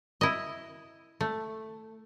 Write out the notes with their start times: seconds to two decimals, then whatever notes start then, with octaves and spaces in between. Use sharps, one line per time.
0.21 E4 D#5
1.21 A3